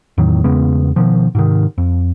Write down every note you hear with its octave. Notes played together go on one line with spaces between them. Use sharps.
E2 A2 D#3 F#3
E2 C#3 G#3 B3
B2 D#3 F3
G#2 C3 D#3
F2